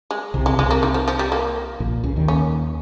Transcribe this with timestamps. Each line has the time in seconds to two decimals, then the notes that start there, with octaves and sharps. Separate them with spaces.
0.11 G#3
0.34 C2 C3
0.46 G#3
0.58 C2 C3 G#3
0.71 A#3
0.83 D#3
0.94 F3
1.08 F3
1.19 G3
1.32 A#3
1.80 A#1 A#2
2.04 C#2 C#3
2.16 D#2 D#3
2.28 C#4